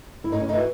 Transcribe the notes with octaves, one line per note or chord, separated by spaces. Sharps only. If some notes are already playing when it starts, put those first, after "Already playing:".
E4
A2 D#4
C#4
A3 D#4
E3 F#4